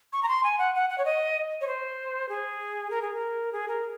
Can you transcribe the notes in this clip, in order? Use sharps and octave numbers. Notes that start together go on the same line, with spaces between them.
C#6
A#5
C6
G#5
F#5
F#5
F#5
C#5
D#5
C#5
C5
G#4
A#4
G#4
A#4
G#4
A#4